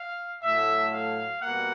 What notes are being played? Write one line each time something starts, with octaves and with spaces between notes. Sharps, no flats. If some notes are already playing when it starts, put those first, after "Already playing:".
Already playing: F5
A2 F#3 A3 E5
F5
B2 G3 A#3 F#5